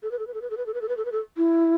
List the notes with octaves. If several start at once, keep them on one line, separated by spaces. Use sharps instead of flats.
A4
B4
A4
B4
A4
B4
A4
B4
A4
B4
A4
B4
A4
B4
A4
E4